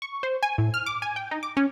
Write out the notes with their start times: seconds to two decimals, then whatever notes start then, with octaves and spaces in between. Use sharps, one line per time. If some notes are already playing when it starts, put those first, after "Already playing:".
0.02 C#6
0.23 C5
0.43 G#5
0.58 A2
0.74 F6
0.86 D6
1.02 G#5
1.16 G5
1.31 D#4
1.43 D6
1.57 C#4